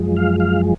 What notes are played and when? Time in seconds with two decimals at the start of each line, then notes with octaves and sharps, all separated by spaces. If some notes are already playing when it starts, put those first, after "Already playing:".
Already playing: F#2 F3 G#3
0.17 F5
0.40 F5